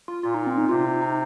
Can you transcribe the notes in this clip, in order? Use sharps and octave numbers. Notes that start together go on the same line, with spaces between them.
F4
A#2 F4
D#4
C4
D#4
C3 F4
D#4
D#4